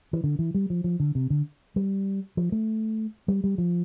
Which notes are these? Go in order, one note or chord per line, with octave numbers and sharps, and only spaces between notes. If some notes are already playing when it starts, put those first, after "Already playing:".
E3
D3
E3
G3
F3
F3
D3
C3
D3
G3
F3
A3
G3
G3
F3